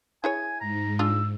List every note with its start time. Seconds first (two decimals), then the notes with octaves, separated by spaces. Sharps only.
0.24 E4 G#4 C#5 G#5
0.61 G#2 A#5
0.99 D4 F4 G#4 E6